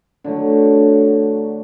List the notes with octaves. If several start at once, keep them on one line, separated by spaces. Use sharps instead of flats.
D3 F#3 A3